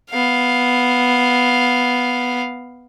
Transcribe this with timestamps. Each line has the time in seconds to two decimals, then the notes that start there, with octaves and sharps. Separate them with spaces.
0.10 B3 F5